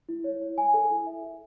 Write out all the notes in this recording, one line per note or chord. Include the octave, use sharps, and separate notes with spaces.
E4
C#5
C#5
G#5
A4
E4
E5
A4